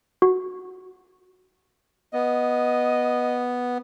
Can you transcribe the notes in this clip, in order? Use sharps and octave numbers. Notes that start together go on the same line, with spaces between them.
F#4
B3 D#5